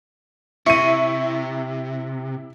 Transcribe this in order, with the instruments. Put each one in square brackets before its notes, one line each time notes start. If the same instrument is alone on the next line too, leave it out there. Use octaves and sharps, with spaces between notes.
[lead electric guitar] C3 [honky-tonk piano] E4 D#7 [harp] C#6